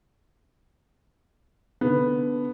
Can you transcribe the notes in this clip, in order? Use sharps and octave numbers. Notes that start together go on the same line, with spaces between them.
D3 B3